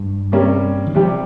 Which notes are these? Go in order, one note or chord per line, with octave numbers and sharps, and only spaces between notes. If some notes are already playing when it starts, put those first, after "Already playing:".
Already playing: G2
C3 G3 A#3 C#4
D#3
C3 F3 G3 C4 G4